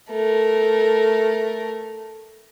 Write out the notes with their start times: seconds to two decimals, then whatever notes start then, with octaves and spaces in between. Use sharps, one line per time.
0.10 A3 A#4